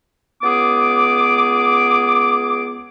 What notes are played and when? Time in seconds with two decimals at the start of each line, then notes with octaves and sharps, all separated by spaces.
0.43 C#2 B3 G#4 D6